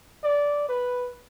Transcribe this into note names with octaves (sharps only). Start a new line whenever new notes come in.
D5
B4